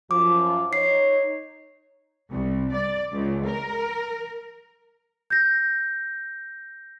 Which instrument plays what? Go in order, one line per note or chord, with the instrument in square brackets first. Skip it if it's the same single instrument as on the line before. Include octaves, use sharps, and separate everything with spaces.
[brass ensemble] F#2 F3 [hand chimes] D6
[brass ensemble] D#4 C#5 [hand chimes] C7
[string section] C2
D5
C#2
A#4
[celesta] G6 A#6